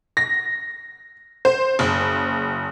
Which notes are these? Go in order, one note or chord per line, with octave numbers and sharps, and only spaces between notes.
A#6
C5
F#1